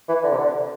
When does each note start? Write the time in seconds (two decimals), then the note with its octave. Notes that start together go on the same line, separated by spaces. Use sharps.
0.08 E3
0.23 D3
0.32 C3
0.38 D3